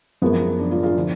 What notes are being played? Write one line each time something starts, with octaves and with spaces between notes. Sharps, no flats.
F#2 F3 G#3 B3
D4
D4 F4
F4 G#4
D3 F3